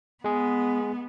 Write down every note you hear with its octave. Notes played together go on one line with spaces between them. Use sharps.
G#3 B3 G#4